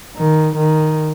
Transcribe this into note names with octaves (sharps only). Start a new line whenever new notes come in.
D#3
D#3